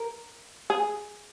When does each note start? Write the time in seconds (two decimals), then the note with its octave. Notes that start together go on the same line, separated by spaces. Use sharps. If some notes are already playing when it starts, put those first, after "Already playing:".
Already playing: A#4
0.70 G#4